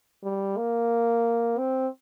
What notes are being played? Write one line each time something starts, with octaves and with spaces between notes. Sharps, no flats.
G3
A#3
C4